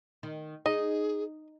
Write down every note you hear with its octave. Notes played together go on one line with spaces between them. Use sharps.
D#3
D#4 G#4 D#5